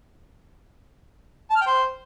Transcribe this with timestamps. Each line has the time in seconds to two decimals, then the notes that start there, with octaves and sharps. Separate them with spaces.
1.50 A5
1.56 F6
1.61 G5
1.67 C5